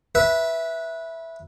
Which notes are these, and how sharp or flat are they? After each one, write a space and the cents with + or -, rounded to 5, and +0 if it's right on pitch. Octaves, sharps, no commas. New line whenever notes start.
B4 -15 E5 +0